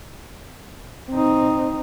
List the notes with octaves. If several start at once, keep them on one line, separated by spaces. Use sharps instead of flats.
C4 D#4